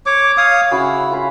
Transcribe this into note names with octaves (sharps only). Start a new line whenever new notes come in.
C#5 D6
C#5 F5 D#6
C#3 E4 F#4 C#6
F4 F5 B5